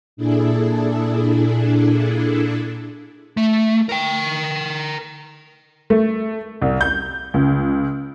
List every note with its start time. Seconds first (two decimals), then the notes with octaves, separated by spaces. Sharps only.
0.17 A#2 D4 E4 G#4 A4
3.37 A3
3.89 A#4 G5
5.90 A3
6.62 C2
6.81 G6
7.34 C#2